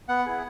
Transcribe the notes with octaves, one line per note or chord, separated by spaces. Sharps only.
B3 F#5
E4 G#4